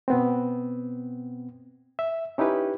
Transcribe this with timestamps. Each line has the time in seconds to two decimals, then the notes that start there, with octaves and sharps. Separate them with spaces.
0.08 B2 B3 C4
1.99 E5
2.38 C#4 D#4 E4 G4 B4